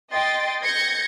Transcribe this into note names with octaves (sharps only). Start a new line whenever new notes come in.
D#5 G5 C6 A6
G6 G#6 A#6 C#7